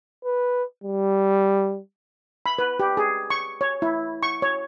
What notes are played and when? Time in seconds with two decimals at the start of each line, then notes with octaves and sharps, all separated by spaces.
0.25 B4
0.84 G3
2.46 B5
2.59 B4
2.79 G4
2.97 G#4
3.30 C#6
3.61 C#5
3.82 E4
4.23 C#6
4.42 C#5